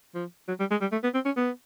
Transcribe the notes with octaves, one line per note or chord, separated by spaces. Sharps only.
F3
F#3
G3
G#3
G3
A3
B3
C4
C#4
B3